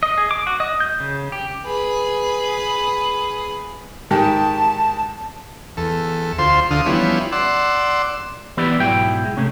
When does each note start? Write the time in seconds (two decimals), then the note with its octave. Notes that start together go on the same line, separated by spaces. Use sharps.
0.03 D#5
0.18 G#4
0.31 D6
0.47 F#4
0.60 D#5
0.80 G6
1.00 C#3
1.32 G4
1.66 G#4 B4
4.11 G#2 D#3 G4 A5
5.77 E2 A4
6.39 D2 F4 C5 C6
6.71 D2 D3 F5 D#6
6.86 E3 F3 G3 B3 C#4 E4
7.32 D5 F#5 C6 E6
8.57 E3 B3 E4 G4 B4 D5
8.80 B1 G#2 F#3 E4 G5
9.25 G#3
9.37 C3 A3 C#4